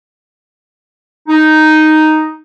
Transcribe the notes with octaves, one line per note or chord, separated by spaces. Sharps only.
D#4